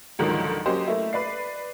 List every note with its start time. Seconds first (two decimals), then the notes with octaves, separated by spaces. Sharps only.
0.19 C#2 G#2 D3 D#3 F3 F#3
0.66 F#3 A#3 C#4 G4 C5 D#5
0.87 A3 A#3 E4
1.13 B4 D5 C7